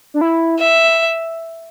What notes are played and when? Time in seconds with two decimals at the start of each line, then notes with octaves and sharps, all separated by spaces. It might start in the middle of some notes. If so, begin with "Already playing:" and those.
0.14 D4
0.21 E4
0.59 E5